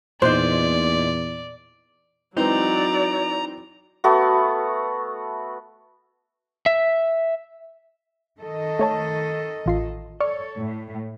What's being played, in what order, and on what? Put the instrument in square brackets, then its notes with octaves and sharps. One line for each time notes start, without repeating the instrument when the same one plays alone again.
[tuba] E2 [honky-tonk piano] A#2 D#4 [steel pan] C5 [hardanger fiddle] D5
[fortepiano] E3 G#3 C4 [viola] F#3 D5 [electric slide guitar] D#4 [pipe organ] A#5
[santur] A3 B3 F#4
[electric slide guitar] E5
[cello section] D#3 A4 D#5
[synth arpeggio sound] A3 C#5 A5
A1 F4 C7
[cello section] A4 C#5 [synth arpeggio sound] D5 C#6 F6
[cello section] A2